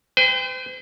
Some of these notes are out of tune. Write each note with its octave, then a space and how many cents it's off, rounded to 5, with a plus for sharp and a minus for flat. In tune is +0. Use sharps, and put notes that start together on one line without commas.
C5 -45 G5 +25